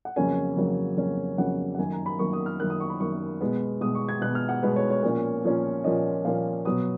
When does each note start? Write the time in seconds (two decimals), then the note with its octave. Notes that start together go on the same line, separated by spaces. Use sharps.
0.05 F#5
0.16 F2 C#3 F#3 A#3 C#4 G#5
0.57 F2 C#3 F#3 A#3 C#4
0.97 F2 C#3 F#3 A#3 C#4
1.38 F2 C#3 F#3 A#3 C#4 F#5
1.75 F#5
1.78 F#2 D#3 A#3 G#5
1.92 A#5
2.06 B5
2.19 F#2 D#3 A#3 C#6
2.33 D#6
2.46 F6
2.60 F#2 D#3 A#3 F#6
2.70 D#6
2.80 C#6
2.90 B5
3.00 F#2 D#3 A#3 C#6
3.41 B2 G#3 B3
3.81 B2 G#3 B3 D#6
3.95 C#6
4.09 G#6
4.21 B2 G#3 B3 F#6
4.35 F6
4.49 F#5
4.63 B2 G#3 B3
4.76 C#5
4.90 C#5
5.03 A#2 F3 A#3 C#4
5.44 A#2 F3 A#3 C#4
5.84 A#2 F3 A#3 C#4 D#5
6.25 A#2 F3 A#3 C#4 F5
6.65 B2 F#3 B3 D#6